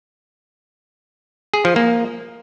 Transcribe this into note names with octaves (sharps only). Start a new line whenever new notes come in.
G#4
F3
A#3